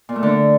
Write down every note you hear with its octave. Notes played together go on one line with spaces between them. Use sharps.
A#2
A3
D3